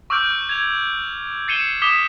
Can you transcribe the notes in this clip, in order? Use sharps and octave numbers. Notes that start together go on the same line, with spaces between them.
C#6 D6 E6 F6 G6 D7
G#6 F7
A6 C7 C#7 D#7 E7 G7
D6 D#6 B6 E7 F7 G7